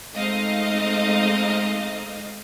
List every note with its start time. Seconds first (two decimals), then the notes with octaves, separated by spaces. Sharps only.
0.15 G#3 A3 C4 D#4 D#5 F5